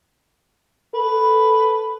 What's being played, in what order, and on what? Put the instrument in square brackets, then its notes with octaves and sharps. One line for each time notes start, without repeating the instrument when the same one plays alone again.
[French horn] A4 [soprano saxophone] B4